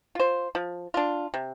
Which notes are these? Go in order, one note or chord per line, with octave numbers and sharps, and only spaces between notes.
F4 C5
F3
D4 F4
C3